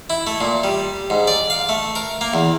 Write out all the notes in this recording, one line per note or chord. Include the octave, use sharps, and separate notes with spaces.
E4
A3
A#2
G3
G#2
D5
F5
A3
A#4
A#3
E2